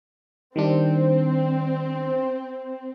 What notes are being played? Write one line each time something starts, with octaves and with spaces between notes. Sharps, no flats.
D#3 G3 C4 D4